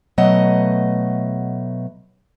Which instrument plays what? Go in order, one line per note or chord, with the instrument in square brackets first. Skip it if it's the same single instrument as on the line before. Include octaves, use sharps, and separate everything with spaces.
[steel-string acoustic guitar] B2 F#3 A3 D#5 F#5